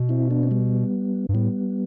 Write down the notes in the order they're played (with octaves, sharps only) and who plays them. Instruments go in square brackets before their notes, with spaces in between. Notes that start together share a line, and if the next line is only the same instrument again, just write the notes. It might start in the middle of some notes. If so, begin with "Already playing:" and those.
Already playing: [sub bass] B2
[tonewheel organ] C4 E4
B3 D4
C4
G3 B3
[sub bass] G2
[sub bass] A2 [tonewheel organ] G3 B3